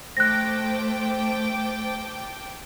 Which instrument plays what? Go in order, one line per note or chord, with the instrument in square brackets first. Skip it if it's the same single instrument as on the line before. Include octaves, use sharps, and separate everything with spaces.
[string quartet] A3 [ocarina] C5 [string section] G5 A5 D6 [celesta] F#6 A#6